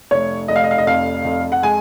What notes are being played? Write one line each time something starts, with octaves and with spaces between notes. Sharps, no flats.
F1 C#5
F1 D#5
F5
D#5
F5
D#5
F2 F5
F2
F#5
G#3 G#5